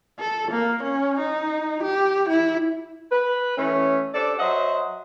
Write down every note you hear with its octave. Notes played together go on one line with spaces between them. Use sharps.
A4
A#3
C#4
D#4
G4
E4
B4
E3 A3 C#4
D4 G4 A4 C5 D5
F#3 C5 D#5 E5 F#5